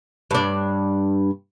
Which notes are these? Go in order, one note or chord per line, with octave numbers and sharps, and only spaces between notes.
G2 D4